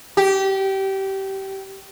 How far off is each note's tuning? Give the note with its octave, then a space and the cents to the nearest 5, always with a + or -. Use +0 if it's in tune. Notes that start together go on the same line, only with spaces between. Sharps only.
G4 -20